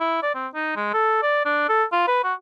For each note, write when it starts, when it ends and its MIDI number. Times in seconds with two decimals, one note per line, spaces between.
0.01 0.20 64
0.23 0.35 74
0.35 0.48 60
0.55 0.73 63
0.76 0.92 56
0.94 1.18 69
1.23 1.44 74
1.46 1.69 62
1.69 1.84 69
1.92 2.07 65
2.08 2.23 71
2.24 2.34 66